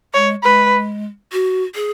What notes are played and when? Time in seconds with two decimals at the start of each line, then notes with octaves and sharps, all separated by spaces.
0.14 G#3 C#5
0.44 G#3 B4
1.32 F#4
1.75 G#4